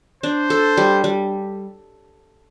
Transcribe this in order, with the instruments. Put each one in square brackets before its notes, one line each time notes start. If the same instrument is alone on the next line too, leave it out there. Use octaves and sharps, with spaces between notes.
[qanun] D4 [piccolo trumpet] C5
[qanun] A4
G3
G3